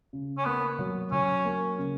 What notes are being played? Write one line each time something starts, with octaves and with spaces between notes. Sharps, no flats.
C#3
C#4
A#3 B3
F#3
F#3 C#4
A#3
C#3